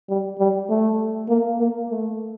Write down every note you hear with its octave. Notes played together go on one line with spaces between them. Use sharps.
G3
G3
A3
A#3
A#3
A3